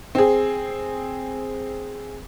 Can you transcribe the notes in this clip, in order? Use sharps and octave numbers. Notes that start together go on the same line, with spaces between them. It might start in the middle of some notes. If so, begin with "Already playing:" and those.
C4 G#4